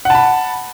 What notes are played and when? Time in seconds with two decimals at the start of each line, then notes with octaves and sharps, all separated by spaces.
0.05 F#5
0.10 A5
0.15 B5